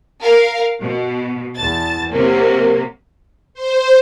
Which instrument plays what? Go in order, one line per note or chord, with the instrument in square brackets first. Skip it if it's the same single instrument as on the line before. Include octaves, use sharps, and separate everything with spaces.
[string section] A#4 F5
B2
E2 A5 A6
C3 F#3 A#3
[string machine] C5